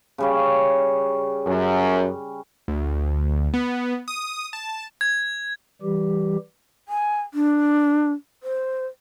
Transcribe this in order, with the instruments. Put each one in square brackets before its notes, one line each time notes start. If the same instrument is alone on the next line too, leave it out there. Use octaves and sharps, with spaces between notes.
[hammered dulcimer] C#3 G3 C#4
[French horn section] F#2
[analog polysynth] D2
B3
D#6
A5
[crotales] G#6
[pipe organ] E3 G3 G4
[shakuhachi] G#5
D4
C5